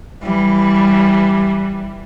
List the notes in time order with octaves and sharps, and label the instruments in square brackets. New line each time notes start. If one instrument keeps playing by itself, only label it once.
[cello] E3 G3